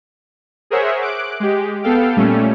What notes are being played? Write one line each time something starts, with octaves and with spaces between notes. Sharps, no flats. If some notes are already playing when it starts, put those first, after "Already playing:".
G#4 A#4 C5 C#5 E5 F#5
D6 F#6 D7
G#3 G4
B3 A4 F5 G5
A#2 G3 A3 C#4